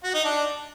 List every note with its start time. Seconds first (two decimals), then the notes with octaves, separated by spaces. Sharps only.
0.04 F#4
0.14 D#4
0.25 D4